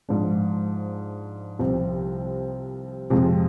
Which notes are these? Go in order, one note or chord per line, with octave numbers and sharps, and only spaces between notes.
G#2 F3 G#3 D4
C2 C3 F3 C4
F2 C3 F3 G#3